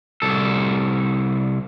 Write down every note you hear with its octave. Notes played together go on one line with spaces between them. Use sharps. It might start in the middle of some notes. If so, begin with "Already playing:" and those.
C2 A4